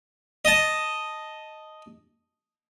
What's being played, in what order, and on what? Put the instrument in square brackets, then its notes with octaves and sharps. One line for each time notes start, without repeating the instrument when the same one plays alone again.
[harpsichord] D#5 A5